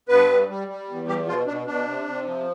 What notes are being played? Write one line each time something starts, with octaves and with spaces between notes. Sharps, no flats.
G2 B3 B4
G3
G3
G3
E2
G3 G4
B2 F3 F4
B2 D4
B2 D4
C3
C3
F3